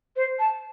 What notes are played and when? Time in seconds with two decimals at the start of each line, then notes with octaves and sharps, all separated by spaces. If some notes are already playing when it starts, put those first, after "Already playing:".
0.15 C5
0.38 A5